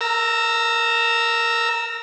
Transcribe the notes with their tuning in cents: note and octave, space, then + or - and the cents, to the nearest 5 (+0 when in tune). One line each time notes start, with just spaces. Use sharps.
A#4 +0 A#5 -35 E6 +0